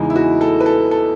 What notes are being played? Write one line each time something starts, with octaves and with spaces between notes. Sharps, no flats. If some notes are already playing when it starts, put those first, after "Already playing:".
Already playing: E2 C#3 E3 G#3 D#4
E4
F#4
A4
B4
A4
A4